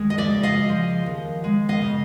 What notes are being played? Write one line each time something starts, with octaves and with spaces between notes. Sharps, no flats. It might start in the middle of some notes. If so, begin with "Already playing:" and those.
Already playing: D#2 G#3
D#5
D5 E5
C#3
D#5 F5
F3
D#2
G#3
D#5 F5
C#3